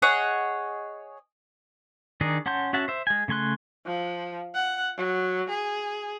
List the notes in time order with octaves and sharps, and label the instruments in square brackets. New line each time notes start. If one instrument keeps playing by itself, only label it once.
[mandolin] G#4 C#5 D#5 F#5
[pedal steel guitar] D#3 D4 D#4 G#4
C#4 F#5 A5 C6 G6
C#4 F#4 E5 F#5 A5
C5 E5
G#3 G#5
C#3 A3 G#5 C6 F#6
[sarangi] F3
F#5
F#3
G#4